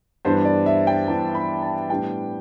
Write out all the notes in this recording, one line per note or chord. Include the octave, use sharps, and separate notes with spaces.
G2 E3 B3 D4 C5
D5
E5
G5
G2 E3 B3 D4 A5
B5
A5
A2 G3 B3 D4 G5